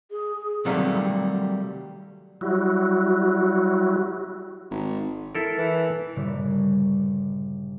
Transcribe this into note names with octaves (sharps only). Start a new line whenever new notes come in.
G#4
C3 D#3 F#3 G3 A3 A#3
F#3 G3 E4 F#4
G#1
E4 A4 A#4
E3
G1 A#2 C#3 G3